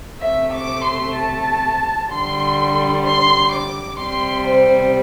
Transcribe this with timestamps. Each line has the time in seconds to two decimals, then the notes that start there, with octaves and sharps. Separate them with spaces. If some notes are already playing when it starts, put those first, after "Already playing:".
0.21 C3 A3 E5
0.53 D6
0.84 C6
1.16 A5
2.10 D3 G3 C6
3.05 C6
3.52 D6
3.99 C3 G3 C6
4.47 C5